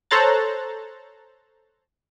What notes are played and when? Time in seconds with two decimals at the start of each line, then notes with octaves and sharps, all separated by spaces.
0.11 A4 C5 C#5 A#5 F#6 A6